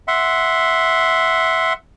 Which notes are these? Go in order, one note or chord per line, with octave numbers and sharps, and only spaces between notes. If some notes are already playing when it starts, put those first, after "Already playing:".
E5 F#5 C6